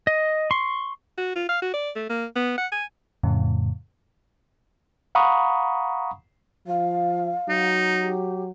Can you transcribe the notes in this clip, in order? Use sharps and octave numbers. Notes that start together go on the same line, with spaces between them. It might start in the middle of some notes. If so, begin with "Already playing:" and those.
D#5
C6 C#6
F#4
F4
F5
F#4
D5
A3
A#3
B3
F#5
G#5
F2 A2 C#3
F5 F#5 A#5 B5 C#6 D#6
F3 F5
F#3 D#4
G4